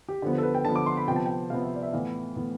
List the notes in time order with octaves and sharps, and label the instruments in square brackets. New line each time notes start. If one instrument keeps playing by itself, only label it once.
[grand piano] G4
D3 F3 B3
B4
A4
B4
G5
D3 F3 B3 A5
D6
C6
B5
C3 F3 B3 G5
A5
G5
C3 F3 B3 F5
E5
D5
E5
A2 E3 B3 F5
A2 E3 B3